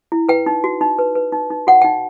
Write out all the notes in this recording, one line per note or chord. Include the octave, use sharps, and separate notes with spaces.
E4
B4 G5
D#4
F#4
D#4
B4
B4
D#4
D#4
F#4 F#5
D#4 G5